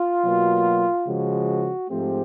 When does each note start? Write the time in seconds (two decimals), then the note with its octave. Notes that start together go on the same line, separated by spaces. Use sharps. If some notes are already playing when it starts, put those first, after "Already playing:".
Already playing: F4
0.23 B2 F#3 A#3
1.06 C#3 F3 G#3 F#4
1.89 G#2 F3 A3 C4 G4